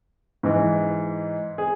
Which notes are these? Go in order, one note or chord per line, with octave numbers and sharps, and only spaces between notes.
G#2 E3
G#4